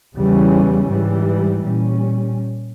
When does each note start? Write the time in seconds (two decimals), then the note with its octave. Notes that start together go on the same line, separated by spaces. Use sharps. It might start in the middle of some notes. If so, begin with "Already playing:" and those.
0.16 E2 C#3 E3 G3 C#4
0.90 G#2 E3 G3
1.63 A#2 G3 C#4